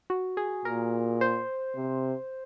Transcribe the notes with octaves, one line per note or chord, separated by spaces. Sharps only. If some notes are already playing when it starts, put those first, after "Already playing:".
F#4
G#4
A#2 A#4
C5
C3